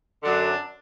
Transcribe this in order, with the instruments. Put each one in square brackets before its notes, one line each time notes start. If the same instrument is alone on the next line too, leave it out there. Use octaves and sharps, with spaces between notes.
[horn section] F#2 D3 F#3 D4